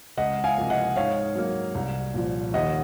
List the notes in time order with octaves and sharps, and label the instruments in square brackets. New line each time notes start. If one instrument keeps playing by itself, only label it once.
[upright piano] C#2 D#5 F#5
F5 G#5
C3 F3 A#3
D#5 F#5
G#2 C#5 F5
F#3 A#3
C2
A#2 F3
D#2 D#5 F#5